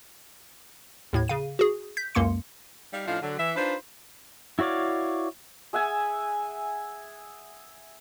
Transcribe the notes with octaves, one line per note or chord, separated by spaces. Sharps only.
D#2 A2 G#6
C#3 F5 D#7
F#4 G#4
G6 B6
C#2 F#2 A#3 C6 C#7
G3 D#4 F5
A2 F3 C#4 D4 D#5 F5
D3 F#3
E3 E5
D4 D#4 F4 B4 C5
E4 F#4 C#5 D5 F5
G#4 E5 F#5 G#5